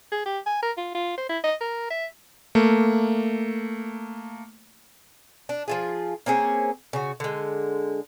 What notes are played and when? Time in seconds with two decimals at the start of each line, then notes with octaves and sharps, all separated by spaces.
0.12 G#4
0.26 G4
0.46 G#5
0.62 A#4
0.77 F4
0.95 F4
1.18 C5
1.29 E4
1.44 D#5
1.61 A#4
1.91 E5
2.55 A3 A#3
5.49 D4
5.68 F3 F4 G#4
6.26 A#3 C4 C#4 G#4
6.93 C#3 F#4
7.20 D3 G#3